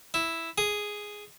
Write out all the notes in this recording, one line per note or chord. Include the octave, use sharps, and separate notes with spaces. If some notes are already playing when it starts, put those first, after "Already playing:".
E4
G#4